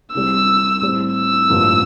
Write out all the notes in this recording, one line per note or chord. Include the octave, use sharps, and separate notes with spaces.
C2 C3 G3 C4 E6
A2 G3 C4
E6
A1 G2 F3 A#3